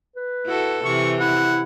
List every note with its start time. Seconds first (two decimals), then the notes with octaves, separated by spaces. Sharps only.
0.16 B4
0.46 E4 F#4 A4
0.85 C3 E3 C#6
1.20 E4 F#5